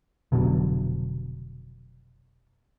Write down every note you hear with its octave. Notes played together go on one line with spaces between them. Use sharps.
F1 B2 D3 F#3